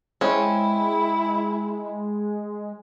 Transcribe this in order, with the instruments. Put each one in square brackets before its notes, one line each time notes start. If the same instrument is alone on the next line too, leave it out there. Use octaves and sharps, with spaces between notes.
[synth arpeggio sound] G#3 [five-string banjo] C4 C#4 [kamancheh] E4